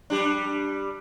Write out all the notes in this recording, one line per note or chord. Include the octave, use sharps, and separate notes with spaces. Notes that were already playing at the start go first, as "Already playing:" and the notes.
G3 D4